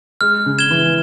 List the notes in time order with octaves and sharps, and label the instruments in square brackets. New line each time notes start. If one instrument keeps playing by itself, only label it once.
[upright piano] G#3 [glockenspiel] F6
[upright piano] C#3
[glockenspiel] G#6 E7 G7
[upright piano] E3